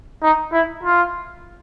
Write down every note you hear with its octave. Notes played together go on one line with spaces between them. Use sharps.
D#4
E4
F4